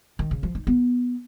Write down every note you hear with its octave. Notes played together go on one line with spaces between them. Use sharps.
D#3
C#3
F3
D#4
B3